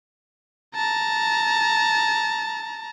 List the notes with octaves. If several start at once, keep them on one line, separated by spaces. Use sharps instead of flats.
A5 A#5